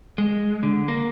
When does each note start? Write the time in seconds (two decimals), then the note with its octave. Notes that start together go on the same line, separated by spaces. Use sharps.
0.18 G#3
0.63 D3
0.88 A#3